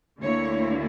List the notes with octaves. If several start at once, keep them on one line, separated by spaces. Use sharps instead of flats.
D2 D3 A#3 E4 C#5